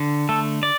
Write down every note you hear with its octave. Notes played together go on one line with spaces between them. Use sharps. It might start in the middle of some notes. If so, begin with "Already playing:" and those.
Already playing: D3
A3 A4
D5